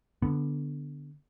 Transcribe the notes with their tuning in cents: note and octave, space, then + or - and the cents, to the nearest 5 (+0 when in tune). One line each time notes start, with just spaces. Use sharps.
D3 +0 B3 +0